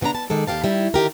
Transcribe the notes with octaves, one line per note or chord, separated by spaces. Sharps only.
C#3 E3 B3 D4 A#5
A5
D#3 G#3 A4 D5
D#2 C3 G4 F5 A5
D#3 G3 E4
D3 D#3 G4 A#4